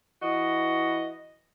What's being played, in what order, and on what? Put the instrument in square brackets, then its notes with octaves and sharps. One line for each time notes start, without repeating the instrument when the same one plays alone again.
[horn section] E3 F#4 D#5